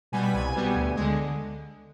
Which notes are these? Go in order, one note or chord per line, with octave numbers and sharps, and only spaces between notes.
B2 G3 B3 G#5
B5
C2 G#5
B2 G3 B3
D2
D3 G#3